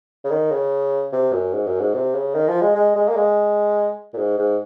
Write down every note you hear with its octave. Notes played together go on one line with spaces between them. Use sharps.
C#3
D#3
C#3
C3
F#2
G#2
F#2
G#2
C3
C#3
D#3
F3
G#3
G#3
G#3
A#3
G#3
A#2
G#2
G#2